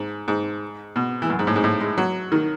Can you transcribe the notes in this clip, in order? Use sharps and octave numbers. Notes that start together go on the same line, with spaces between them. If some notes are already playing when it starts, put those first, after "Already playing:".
Already playing: G#2
G#2
B2
E3
F#2
G#2
A2
G#2
A2
G#3
F#3
D#3